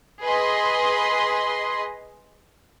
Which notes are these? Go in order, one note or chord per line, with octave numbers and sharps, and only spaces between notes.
G#4 B4 D#5 C6